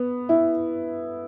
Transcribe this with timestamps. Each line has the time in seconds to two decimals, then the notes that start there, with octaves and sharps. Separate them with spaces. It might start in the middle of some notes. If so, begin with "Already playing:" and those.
Already playing: B3
0.29 E4